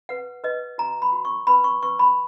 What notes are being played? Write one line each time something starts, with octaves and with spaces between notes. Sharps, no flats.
B4 F#5
B4 D#5
F#4 A#5
B5
F#4
C#6
B4 B5
C#6
B4 C#6
B5